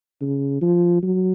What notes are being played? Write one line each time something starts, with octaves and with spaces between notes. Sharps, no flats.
C#3
F3
F#3